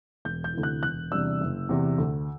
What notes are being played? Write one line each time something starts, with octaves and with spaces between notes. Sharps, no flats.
E1 G6
G6
D2 C3 E3
F#6
E1 F#6
E2 C3 G3 D4 E6
F#1
E2 C3
D2